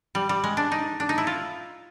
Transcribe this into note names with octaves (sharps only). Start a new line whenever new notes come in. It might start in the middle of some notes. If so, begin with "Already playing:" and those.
G3
G3
G#3
D4
D#4
D4
D#4
E4
F4